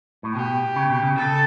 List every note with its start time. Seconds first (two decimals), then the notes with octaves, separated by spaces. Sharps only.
0.23 A2
0.35 B2 G4
0.76 C#3
0.90 B2
1.03 C#3
1.16 C#3 A4